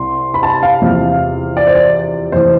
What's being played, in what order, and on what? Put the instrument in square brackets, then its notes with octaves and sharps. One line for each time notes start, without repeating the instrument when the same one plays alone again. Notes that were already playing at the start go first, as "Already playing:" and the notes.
Already playing: [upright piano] C2 C3 C6
B5
A5
F5
E2 C3 F3
D5
C5
D5
F1 E3 C5